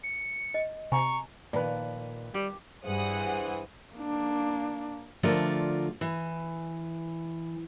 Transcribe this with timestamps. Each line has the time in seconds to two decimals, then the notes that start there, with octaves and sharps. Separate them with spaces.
0.03 C#7
0.54 D#5
0.92 C3 G#5 A#5 C#6
1.53 A#2 D#3 F3 B4 D5
2.34 G3 G4
2.84 G2 E3 G#4 C5 F#5 D#6
3.95 A#3 D4
5.23 D3 F3 A3 F4 A#4 D5
6.01 E3